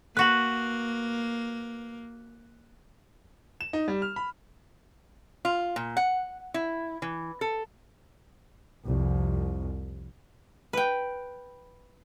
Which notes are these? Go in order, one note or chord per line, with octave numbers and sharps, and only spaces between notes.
A#3 F#4 B4 F#6 F#7
E7
D#4
G3
F6
B5
F4
A#2
F#5
E4
E3
A4
C2 F2
B4 G5